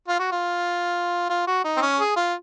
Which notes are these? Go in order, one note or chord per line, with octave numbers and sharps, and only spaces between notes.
F4
F#4
F4
F4
F#4
D#4
C4
C#4
G#4
F4